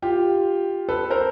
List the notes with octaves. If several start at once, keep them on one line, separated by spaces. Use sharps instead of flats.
F4 G4
A4 B4
A#4 C5